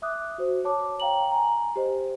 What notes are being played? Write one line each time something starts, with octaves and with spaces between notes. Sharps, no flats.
E5 D6 D#6 F#6
F#4 C5
C#5 A5 D6
F5 G5 A#5 F#7
G#5 A#5
G4 C5 D#5